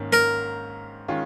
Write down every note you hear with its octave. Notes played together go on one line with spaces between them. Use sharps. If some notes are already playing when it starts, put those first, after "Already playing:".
Already playing: G#2 D#3 A#3 C#4
A#4
D#3 G#3 C#4 F4